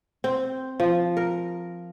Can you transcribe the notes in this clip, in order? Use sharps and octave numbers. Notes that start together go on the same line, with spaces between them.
C4
F3
A#4